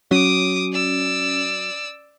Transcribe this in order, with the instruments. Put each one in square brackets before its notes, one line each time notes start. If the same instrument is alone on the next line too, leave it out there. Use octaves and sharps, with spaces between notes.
[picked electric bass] F#3 [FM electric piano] C#4 [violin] D6 D#6
[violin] D5 E6